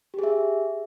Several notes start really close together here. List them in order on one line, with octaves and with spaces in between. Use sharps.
G4 G#4 E5